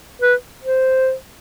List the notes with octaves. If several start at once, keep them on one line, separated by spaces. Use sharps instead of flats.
B4
C5